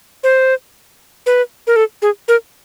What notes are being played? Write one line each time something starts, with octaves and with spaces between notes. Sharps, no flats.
C5
B4
A#4
A4
G#4
A#4